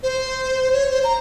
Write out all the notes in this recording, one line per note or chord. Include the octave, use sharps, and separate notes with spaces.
C5
C#5
C5
A#5